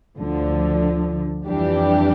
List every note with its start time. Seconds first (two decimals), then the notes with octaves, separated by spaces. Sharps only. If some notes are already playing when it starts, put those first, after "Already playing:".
0.17 D2 D3 F3
1.48 F2 E3 G3 D4 G4